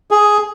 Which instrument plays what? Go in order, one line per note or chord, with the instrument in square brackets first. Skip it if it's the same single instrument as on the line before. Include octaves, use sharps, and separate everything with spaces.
[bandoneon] G#4